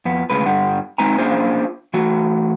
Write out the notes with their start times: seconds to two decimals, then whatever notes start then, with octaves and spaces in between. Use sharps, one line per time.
0.05 F2 B3
0.30 D2 C#3 G#3 B4
0.45 G2 D3 G3 F#5
0.98 G#3 C4 D#4 B4 G#5 A#5
1.18 A#3 C#4 D4 F4 G#4 C5
1.94 E3 A3 F#4